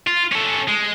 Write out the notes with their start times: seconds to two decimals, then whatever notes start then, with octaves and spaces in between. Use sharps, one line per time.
0.07 F4
0.32 C#4 A4
0.68 G#3